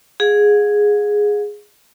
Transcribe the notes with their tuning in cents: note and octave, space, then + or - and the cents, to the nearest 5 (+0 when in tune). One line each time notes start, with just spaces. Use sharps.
G#4 +0 F5 +45